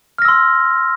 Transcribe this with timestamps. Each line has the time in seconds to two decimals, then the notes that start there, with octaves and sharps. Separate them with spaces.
0.18 F6
0.22 A#6
0.25 E6
0.28 C6